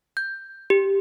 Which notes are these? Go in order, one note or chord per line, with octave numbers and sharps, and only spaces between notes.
G6
G4